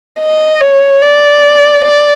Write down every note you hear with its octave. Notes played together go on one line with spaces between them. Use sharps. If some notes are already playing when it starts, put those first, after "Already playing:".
D#5
C#5
D5
D5